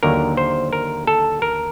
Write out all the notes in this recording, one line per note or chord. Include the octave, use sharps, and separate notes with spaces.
D#2 D3 F#3 A#4
C5
A#4
A4
A#4